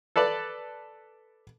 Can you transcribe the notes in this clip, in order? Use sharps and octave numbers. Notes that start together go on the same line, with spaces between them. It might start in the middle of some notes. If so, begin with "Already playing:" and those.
A4 B4 D5 A5